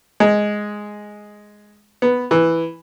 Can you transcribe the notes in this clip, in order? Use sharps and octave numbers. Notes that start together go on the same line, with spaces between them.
G#3
B3
E3